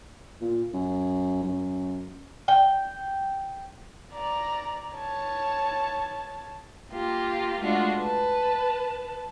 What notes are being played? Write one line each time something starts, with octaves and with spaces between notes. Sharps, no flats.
A#2
F#2
F#2
G5
D5 A#5
C#5 A5
A#3 F4 G4
G#3 A3 D4 F4 F#4
B4 A5